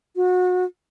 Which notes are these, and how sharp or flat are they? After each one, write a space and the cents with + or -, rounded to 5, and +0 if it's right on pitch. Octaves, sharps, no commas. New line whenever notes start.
F#4 -30